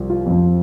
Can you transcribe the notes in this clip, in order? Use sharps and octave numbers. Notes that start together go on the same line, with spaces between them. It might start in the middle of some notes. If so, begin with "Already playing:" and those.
Already playing: C2 C3 F3
F4
F2 F3